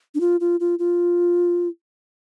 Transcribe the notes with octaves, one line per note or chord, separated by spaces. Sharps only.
D4
F4
F4
F4
F4